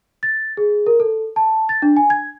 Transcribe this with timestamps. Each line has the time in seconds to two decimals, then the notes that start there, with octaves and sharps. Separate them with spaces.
0.23 A6
0.57 G#4
0.86 A#4
1.00 A4
1.36 A5
1.69 A6
1.82 D4
1.97 G#5
2.10 G#6